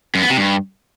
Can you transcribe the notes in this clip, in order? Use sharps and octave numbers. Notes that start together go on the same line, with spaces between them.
F#2
B3
C3
G2